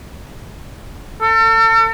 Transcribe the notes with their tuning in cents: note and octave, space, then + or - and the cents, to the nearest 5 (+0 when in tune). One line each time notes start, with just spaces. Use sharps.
A4 +40